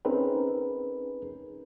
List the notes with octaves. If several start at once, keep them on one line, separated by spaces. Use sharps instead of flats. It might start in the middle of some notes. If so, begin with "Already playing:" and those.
C4 C#4 D#4 G#4 A#4 B4